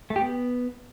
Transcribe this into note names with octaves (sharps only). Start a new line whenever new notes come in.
A3
G4
B3